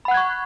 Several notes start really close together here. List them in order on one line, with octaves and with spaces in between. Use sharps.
B5 F#5 F#6 G#6 C#6